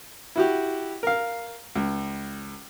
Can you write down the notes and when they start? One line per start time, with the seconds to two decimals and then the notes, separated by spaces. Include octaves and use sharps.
0.36 E4 F#4 G4
1.03 A#4 F5
1.76 C#2